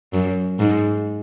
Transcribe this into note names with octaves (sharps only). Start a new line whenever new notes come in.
F#2
G#2